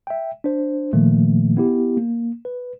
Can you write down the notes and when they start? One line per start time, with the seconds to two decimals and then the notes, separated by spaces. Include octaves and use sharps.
0.07 E5 G5
0.44 D4 C5
0.93 A#2 D#3 F3 A3 A#3
1.57 B3 E4 G4
1.97 A#3
2.45 B4